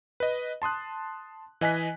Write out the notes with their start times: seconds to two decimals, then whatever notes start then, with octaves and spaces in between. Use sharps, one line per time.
0.20 B4 D#5
0.62 A5 C6 D#6 F#6
1.61 E3 D#5 G#5 F#6 B6